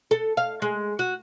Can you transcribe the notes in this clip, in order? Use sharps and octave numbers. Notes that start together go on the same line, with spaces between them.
A4
F5
G#3
F#4